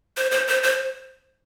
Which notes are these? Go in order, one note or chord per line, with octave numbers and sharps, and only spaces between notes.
C5
C5
C5
C5